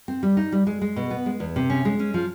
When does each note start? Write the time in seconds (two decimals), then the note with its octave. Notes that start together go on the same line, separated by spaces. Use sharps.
0.08 C4
0.23 G3
0.37 D#4
0.52 G3
0.67 G#3
0.82 G#3
0.96 B2
1.11 B3
1.26 G#3
1.40 E2
1.56 C3
1.70 C#4
1.85 G#3
1.99 C#4
2.14 F3